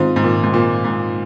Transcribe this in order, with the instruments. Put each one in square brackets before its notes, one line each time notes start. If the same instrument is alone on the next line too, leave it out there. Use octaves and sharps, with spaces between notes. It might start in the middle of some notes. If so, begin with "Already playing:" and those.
Already playing: [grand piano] G#2 [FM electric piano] D#3 G#3 C4 F4 C5
[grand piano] G#2
A#2
G#2
A#2
G#2